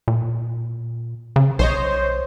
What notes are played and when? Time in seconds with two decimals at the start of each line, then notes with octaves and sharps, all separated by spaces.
0.08 A#2
1.36 C#3
1.59 B1 C5 C#5 D#5